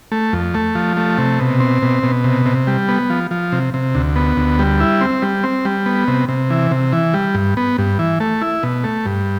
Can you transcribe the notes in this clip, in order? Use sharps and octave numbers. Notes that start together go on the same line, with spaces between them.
A3
F2
A3
F3
A3
C3
B2
C4
B2
B2
C3
C3
G3
B3
F3
F3
C3
C3
D2
B3
D2
G3
E4
C4
G3
C4
G3
B3
C3
C3
E3
C3
E3
G3
G2
B3
G2
E3
A3
E4
B2
A3
G2